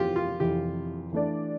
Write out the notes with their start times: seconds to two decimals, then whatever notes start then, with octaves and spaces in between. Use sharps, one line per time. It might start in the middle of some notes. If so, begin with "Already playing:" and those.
Already playing: F2 C3 E3 F4 G4
0.16 F4
0.40 F2 C3 E3 G4
1.13 E3 A3 D4 A4 D5